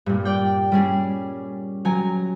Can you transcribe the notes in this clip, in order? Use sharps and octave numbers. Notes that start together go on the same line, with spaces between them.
G2 A#2
D5 G5
G3 C#4 G#4
F#3 G#5 A#5